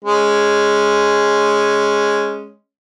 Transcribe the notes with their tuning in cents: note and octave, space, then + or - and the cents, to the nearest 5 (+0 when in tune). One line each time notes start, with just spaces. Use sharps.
G#3 +0 C#4 -5